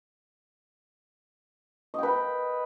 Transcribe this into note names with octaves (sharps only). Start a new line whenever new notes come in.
B4 D#5 G5